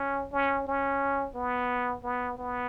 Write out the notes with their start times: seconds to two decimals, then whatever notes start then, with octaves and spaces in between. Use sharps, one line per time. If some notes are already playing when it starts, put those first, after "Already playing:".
Already playing: C#4
0.32 C#4
0.67 C#4
1.35 B3
2.04 B3
2.38 B3